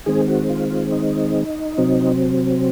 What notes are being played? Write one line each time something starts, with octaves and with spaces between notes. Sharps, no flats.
D#3 G#3 C4 G#4
F#4
F4
F4
D#4
C3 F#3 C4